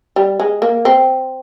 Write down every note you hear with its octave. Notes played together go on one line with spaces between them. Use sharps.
G3
G#3
A#3
C4